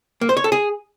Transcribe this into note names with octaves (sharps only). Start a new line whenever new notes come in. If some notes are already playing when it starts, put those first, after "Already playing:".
A#3
C5
C#5
A4
G#4